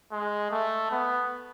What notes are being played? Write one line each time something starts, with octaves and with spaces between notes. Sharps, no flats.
G#3
A3
B3